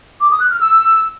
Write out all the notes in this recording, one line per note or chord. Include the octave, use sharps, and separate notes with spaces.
D6
D#6
F#6
F6
E6